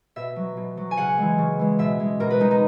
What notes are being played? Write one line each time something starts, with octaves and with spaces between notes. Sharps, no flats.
B2 E5
F#3
B2
F#3
G#5
C#3 F#5
E3 G#3
C#3
E3 G#3
B2 E5
G#3
B2 A#4
B4
G#3 D#4
D#4